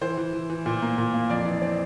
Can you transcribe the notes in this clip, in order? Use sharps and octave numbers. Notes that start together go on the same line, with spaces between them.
E3 C5
E3
E3
E3
A#2
A#3
A#2
A#3
F2 D5
E3
C4 D5